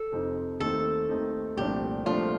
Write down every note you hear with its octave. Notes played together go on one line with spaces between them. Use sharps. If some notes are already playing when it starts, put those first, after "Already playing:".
Already playing: A4
F2 C3 F3 C4 D#4
D#2 D#3 A3 C4 D#4 A4
D#2 D#3 A3 C4 D#4
C2 A#2 F3 A3 D4 G4
C2 A#2 F3 A3 D4 F4